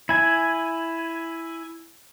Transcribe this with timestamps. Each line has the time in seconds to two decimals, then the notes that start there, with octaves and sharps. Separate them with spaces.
0.09 E4 G#5